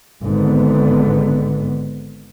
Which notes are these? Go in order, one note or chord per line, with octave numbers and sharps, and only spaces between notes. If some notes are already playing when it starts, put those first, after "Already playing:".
G#1 G#2 D3 B3